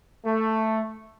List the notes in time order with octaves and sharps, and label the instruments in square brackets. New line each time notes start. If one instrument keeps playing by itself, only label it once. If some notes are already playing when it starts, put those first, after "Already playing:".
[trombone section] A3